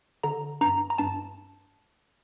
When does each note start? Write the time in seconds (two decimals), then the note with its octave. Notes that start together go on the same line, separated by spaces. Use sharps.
0.23 D3 A#5
0.61 G2 A#5
0.90 A#5
0.98 G2 A5